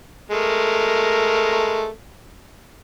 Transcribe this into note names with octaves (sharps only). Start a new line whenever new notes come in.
G#3 A3 A#4